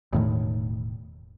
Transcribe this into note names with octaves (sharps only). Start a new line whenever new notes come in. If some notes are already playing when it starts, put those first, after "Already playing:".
E1 A2 D#3